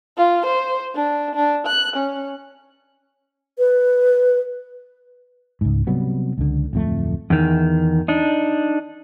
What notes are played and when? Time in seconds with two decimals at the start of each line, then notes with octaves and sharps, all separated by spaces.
0.17 F4
0.46 C5
0.95 D4
1.35 D4
1.66 F#6
1.96 C#4
3.58 B4
5.61 C#2 G#2
5.87 C3 F#3 G3 B3
6.38 C#2 D3
6.73 D1 F2 A3
7.30 E2 D#3
8.08 D4 D#4